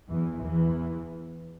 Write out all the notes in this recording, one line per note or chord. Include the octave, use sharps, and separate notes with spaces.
E2 E3
E2 E3